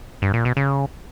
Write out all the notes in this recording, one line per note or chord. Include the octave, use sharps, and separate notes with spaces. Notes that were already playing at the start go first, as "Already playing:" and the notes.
G2
A#2
B2
C#3